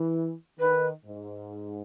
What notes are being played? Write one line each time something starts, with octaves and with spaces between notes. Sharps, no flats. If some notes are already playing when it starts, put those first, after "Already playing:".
Already playing: E3
D#3 B4
G#2